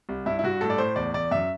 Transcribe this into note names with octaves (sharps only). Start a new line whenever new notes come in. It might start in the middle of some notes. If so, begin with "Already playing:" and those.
C2
G2 E4
E4
G2 F#4
A2 A4
D5
A2 C5
E2 D5
E2 D5
F#2 E5